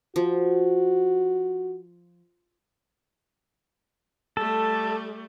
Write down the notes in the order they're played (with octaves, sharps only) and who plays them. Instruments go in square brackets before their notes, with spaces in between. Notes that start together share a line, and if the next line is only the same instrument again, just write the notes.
[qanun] F3 [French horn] F#4
[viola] G3 A3 [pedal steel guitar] A4